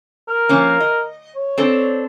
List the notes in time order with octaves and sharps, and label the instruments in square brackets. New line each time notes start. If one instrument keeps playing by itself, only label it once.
[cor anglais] A#4
[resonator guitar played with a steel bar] F3 A#3 C#4
D#5
[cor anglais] C#5
[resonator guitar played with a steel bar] C4 D4 A4